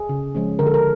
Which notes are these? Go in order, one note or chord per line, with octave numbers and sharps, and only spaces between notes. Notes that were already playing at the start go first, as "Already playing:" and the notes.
Already playing: G#4
C#3
F3 G#3 C#4
D3 A#4
A4
A#4